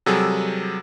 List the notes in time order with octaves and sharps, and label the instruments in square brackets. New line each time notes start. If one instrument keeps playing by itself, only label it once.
[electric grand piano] C3 F#3 G3 G#4 A4